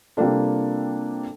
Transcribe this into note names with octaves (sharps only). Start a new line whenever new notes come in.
C3 G3 A#3 D4 F4 A4